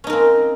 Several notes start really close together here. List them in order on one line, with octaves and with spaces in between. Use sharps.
C#4 D#4 A#4 C4